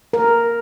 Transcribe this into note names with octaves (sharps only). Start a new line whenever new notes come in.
A#4